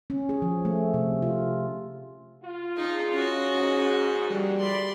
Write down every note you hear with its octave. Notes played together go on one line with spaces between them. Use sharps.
C#4
G#4
F3
A3
C3
F4
F4
C4 D4 D#4 G#4
C#4 F#4 D#5
G#2 G#3 A#3 G#4
D3 E3 G3 A#3 F#4 G#4
D2 D5 B5 C6